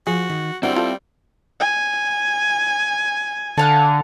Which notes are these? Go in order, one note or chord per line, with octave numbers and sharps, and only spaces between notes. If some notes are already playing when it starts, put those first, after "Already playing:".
F3 F#4 G#4
D#3
D3 G3 C4 E4 F#4 E5
F4 A4
G#5
D3 A4 F5 F#5